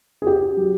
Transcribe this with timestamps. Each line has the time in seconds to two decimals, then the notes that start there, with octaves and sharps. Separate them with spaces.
0.22 G#4
0.26 C#4 G4
0.57 F#3